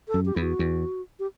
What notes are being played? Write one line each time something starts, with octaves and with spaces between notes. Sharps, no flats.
A4
F#2
G4
E2 E4
F#4
E2
G4